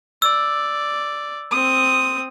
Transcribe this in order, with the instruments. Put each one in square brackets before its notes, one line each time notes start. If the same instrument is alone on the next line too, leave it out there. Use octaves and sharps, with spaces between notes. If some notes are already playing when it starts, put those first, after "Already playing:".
[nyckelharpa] D5 [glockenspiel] E6
[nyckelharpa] C4 D#6